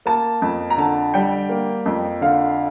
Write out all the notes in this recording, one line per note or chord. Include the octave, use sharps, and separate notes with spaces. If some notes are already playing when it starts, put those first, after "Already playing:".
A#3 A5
F2
A#5
D3 A5
G3 G5
A#3
F2
D3 F5